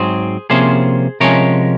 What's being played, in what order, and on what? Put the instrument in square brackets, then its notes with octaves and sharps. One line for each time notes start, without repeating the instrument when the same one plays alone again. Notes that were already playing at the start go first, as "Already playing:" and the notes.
Already playing: [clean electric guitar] G#2 F#3 C4 G#4 C5
C3 F3 A#3 C#4 G#4 C5
C3 F3 G#3 C#4 A#4 C#5